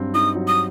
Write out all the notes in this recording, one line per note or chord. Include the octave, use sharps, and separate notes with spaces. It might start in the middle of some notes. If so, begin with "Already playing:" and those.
Already playing: G2 F#3 C4
D#4 D#6
F#3
D#6